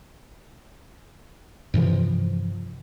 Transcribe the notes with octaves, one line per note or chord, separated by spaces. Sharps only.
G2 C3 E3 F3